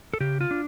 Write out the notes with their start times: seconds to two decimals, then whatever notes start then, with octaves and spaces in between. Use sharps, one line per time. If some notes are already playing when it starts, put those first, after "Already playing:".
0.14 A4
0.20 C#3 G4
0.41 F4
0.51 D4